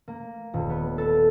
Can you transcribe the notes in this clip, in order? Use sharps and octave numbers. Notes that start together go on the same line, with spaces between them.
A#3
D#1
B3
A4